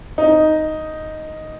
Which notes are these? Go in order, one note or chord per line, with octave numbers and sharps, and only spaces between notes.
D#4